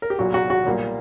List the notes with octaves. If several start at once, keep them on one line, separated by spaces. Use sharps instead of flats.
A#4
G4
B1 A#2 F#3 F#4
F#4
F#4
B1 A#2 G3 A#3